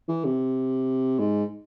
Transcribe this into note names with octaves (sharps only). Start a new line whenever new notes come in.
E3
C3
G#2